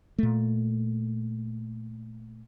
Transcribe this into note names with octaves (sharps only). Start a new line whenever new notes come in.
A#2 A3